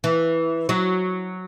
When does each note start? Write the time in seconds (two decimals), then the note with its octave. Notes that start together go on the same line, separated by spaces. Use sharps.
0.04 E3
0.69 F#3